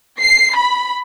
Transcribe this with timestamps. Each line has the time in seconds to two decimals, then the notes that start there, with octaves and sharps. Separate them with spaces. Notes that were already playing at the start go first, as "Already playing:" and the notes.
0.21 C7
0.56 B5